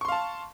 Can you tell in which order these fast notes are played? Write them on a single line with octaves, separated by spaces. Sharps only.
C#6 C6 F5 A5